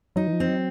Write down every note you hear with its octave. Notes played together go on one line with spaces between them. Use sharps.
F#3 D#4
E3
F3
C4
F#3